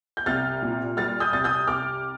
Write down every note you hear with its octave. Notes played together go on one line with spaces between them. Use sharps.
G6
C2 F6 A6
A#2
G3 F6 A6
D#6 G6
C2 A6
D#6 G6
C2 D6 F6